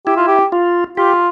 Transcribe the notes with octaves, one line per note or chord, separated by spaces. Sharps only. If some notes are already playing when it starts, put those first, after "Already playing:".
E4 G4
F4
G4
F4
F4 G4